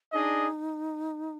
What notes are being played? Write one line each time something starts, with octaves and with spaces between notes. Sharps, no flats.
D4 D#4 G#4 D#5